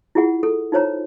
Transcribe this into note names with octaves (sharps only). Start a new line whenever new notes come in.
E4 F4 G#4 F#5
A4
D#4 F4 C5 C#5 A#5